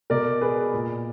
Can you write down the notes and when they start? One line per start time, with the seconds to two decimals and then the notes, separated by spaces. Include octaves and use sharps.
0.10 B2 A#4 D5
0.41 G#4 B4
0.74 A#2